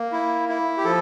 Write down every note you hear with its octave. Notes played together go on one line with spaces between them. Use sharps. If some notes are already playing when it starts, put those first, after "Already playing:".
Already playing: A#3
E4
E4
G4
F3 A4